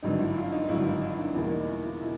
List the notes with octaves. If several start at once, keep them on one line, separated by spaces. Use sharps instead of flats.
G#1 G2 D3 F#3 D#4
E4
F4
D#4
G#1 G2 D3 F#3 E4
D#4
E4
E2 B2 G3 A#3 E4
D#4
E4
F4
B2 E4